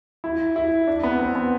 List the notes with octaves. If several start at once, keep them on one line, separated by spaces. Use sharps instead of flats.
E4
E4
D4
B3
C4
B3